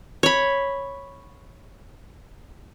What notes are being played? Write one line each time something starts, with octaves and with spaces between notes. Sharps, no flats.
C#5 B5